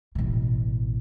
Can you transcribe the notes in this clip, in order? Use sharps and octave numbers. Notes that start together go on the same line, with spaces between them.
A1 B2